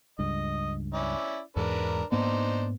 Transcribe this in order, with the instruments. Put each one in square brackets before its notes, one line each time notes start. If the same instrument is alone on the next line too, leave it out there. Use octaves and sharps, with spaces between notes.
[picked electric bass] C#2 G2 [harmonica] D#5
[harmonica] C#4 E4 D5
[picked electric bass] E2 G#2 G#3 [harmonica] D4 A#4 B4
[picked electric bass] G#2 A#3 B3 [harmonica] D4 D#4 C5